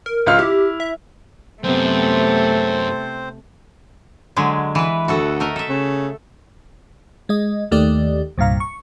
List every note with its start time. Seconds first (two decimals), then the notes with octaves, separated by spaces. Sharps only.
0.06 A#4
0.26 C#2 F4 F6
0.39 E4 G4
0.80 E5
1.64 F#2 C3 A3 B3 C4 C5
4.36 D3 F#3 G#3
4.75 E3 B4
5.08 D2 F#4 A4 F#5
5.40 A3 A#4 D#5
5.56 A4 E5
5.69 C#3
7.29 G#3 D#5
7.71 D#2 D#3 A3 G4 D5
8.38 C2 G2 A#2 F5 A#5
8.60 C#6